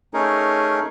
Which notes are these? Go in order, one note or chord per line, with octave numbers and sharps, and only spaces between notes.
A3 C#4 D#4 G#4 A#4